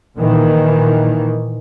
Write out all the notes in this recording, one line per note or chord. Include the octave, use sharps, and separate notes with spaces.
A#2 D#3 E3